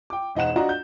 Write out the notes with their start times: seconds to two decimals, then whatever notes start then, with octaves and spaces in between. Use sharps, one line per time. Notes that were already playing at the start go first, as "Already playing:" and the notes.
0.10 G5 D6
0.35 E1 D#4 C5 F#5 E7
0.56 D4 F4 F#4 D#5 F#5 A#5
0.69 G6